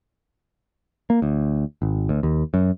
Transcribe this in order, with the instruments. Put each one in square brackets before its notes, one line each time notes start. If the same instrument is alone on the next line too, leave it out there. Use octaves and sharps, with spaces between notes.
[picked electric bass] A#3
D2
G#1
D2
D#2
F#2